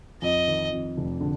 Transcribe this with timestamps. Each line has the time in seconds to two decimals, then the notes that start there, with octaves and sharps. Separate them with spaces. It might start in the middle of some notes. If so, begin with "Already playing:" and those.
0.22 F2 D#5
0.47 D#3
0.72 F2
0.97 F1
1.21 D3